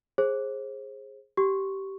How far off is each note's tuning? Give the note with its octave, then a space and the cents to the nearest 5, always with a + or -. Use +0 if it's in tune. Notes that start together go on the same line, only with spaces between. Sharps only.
G#4 +0 C5 +35
G4 -15 C#6 +0